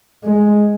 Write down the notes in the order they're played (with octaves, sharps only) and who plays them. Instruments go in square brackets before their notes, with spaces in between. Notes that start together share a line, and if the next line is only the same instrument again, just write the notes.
[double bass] G#3